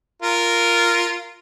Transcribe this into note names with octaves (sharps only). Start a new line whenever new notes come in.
F4 A#4